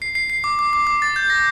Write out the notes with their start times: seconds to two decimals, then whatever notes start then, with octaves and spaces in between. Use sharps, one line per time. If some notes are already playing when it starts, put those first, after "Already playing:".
0.02 C7
0.15 C7
0.30 C7
0.44 D6
0.59 D6
0.73 D6
0.87 D6
1.02 A6
1.16 G6
1.30 A#6